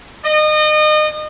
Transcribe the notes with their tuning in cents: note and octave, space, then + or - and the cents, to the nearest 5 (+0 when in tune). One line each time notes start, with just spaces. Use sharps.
D#5 -30